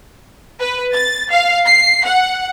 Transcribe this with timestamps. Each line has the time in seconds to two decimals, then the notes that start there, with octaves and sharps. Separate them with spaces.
0.60 B4
0.94 A6
1.32 F5
1.67 C7
2.06 F#5